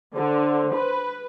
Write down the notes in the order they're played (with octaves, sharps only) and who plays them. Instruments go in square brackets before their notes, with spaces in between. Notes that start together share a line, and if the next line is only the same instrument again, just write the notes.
[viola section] D3 [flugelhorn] C5
[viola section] B4